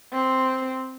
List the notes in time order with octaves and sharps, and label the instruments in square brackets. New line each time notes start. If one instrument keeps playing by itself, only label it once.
[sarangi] C4